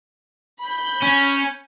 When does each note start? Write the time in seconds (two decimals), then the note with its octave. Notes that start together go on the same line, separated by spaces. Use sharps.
0.61 B5 G6
1.02 C#4